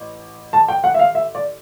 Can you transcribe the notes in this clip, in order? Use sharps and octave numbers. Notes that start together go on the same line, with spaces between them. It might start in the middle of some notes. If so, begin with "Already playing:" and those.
Already playing: A1
A5
G5
F#5
E5
F5
E5
D5